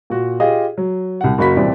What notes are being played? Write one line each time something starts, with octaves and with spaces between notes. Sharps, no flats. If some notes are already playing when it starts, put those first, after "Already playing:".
A#2 F#4
F4 G4 G#4 D#5 F5
F#3
C2 F#5
F#1 A#3 F#4 B5 B6
D#1 C2 E3 C4 D5